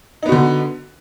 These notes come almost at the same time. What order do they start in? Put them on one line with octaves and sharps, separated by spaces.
D#4 B3 F#4 D3